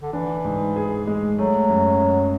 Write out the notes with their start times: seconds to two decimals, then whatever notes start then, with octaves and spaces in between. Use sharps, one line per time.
0.02 D3
0.13 E3 D4
0.45 G#2
0.76 G#4
1.07 G#3
1.38 F#3 A3
1.70 F#2
2.01 F#2